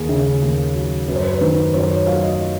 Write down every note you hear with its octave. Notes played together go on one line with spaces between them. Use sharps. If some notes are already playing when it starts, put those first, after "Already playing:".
Already playing: D#2 G#4
C#3
D#2
F#3
F#2 B4
C5
B4
C5
D#3 B4
F#2 C5
C#5
F#3 F5
D#5